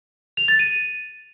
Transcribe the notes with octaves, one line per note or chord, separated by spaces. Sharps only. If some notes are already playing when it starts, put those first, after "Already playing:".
F7
A6
D#7